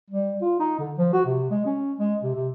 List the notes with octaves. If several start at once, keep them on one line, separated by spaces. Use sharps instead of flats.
G3
F4
D#4
D3
F3
F#4
C3
G#3
C#4
G#3
C3
C3